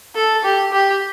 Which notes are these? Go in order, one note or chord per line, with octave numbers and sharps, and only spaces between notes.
A4
G4
G4